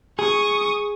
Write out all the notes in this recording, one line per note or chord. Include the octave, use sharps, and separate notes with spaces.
G#4 C#6 D#6